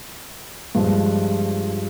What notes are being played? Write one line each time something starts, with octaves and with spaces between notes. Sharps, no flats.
G2 F3 G#3